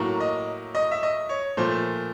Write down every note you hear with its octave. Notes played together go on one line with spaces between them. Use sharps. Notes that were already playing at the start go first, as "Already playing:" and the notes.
Already playing: A2 F#3 A#3
D#5
D#5
E5
D#5
C#5
A#2 F3 A3 C5